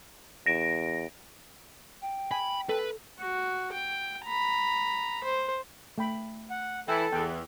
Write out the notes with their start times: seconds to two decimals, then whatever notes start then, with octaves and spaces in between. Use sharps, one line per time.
0.46 E2 A#6 D7
2.02 G5
2.31 G#5 B5
2.69 A4 B4
3.20 F#4
3.73 G5
4.25 A#5 B5
5.24 C5
5.98 A3 G5 B5
6.50 F#5
6.88 E3 E4 A4 G5
7.13 E2 G5